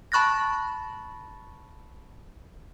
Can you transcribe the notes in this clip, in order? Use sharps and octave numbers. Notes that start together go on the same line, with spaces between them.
A5 B5 C#6 F#6 A6 A#6